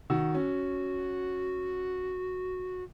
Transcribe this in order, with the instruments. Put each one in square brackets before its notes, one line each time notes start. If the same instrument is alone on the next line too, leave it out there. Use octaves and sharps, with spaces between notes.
[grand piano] D#3 F#4 E6
[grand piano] C#4 [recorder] F#4